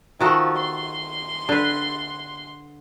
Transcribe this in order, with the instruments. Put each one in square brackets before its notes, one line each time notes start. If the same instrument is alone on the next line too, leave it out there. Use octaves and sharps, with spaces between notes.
[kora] D#3 F#4 A4 [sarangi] F3
[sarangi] C6
[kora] D3 B4